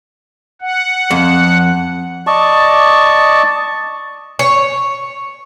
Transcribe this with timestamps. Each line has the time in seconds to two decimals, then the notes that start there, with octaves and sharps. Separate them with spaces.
0.61 F#5
1.11 F2
2.27 D5 D#5 A5 C#6
4.39 C#5